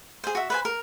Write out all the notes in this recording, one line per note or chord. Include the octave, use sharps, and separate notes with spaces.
G#4 C5
F#4 E5
B4 C5 G#5
A#4